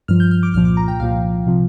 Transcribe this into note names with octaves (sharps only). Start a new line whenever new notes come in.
G2 F3 F6
G6
F6
D6
C2 A#2 F3 F6
D6
A#5
G5
C2 A#2 F3 F5
C3 F3